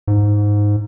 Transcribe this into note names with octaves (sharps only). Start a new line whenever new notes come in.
G#2